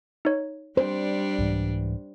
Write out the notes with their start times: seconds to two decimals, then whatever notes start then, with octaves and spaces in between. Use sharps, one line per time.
0.25 D#4 C#5
0.77 G3 D4 C5
1.38 C2 G#2 E3